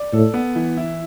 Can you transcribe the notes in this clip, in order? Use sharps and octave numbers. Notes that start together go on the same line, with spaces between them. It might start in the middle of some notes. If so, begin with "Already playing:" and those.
Already playing: D5
A2 A4
B3
E3
E4